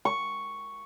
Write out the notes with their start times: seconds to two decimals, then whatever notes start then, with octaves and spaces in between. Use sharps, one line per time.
0.05 C#6